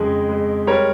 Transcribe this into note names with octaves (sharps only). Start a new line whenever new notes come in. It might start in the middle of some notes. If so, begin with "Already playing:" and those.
Already playing: F2 C#3 G#3 G#4
G#3
G3 A#4 C#5